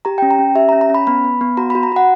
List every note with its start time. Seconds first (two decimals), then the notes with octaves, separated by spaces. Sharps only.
0.05 G4 A#5
0.18 C#4 G5
0.31 A#5
0.39 C#4
0.55 G4 E5
0.69 A#5
0.72 C#4
0.81 A#5
0.90 C#4 B5
1.07 B3 B5
1.24 B3
1.41 B3
1.57 F#4 A#5
1.70 F#4 B5
1.83 A#5
1.92 F#4 F#5